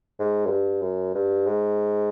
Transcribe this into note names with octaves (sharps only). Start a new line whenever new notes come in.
G#2
F#2
G2
F#2
G2
G#2